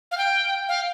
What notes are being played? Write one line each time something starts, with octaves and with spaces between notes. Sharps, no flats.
F5
G5
F5